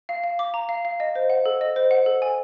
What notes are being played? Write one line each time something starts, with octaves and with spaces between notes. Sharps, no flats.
F5
F5
D6
A#5
F5
F5
D#5
C5
F#5
A4
D#5
C5
F#5
A4
G#5